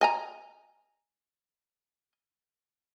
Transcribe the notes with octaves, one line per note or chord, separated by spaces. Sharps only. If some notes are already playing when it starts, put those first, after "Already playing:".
D#5 G#5 A#5